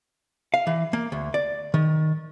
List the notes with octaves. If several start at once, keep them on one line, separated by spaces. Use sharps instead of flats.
F5
E3
A#3
D2
D5
D#3